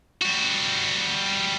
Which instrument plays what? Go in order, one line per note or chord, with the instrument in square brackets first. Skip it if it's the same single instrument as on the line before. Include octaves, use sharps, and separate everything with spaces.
[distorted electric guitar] G3 F#4